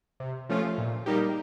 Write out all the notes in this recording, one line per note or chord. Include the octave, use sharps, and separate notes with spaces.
C3
F3 A3 C#4 F4
A#2
G3 A#3 D#4 G4